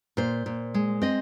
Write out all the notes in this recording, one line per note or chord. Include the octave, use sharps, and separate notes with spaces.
A#2 C5
A#2
G#3
C4 D#5